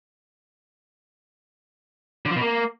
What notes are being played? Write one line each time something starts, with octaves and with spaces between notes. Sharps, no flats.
D3
F3
B2
A#3